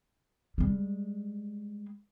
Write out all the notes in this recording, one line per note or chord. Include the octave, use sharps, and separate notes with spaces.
G3 G#3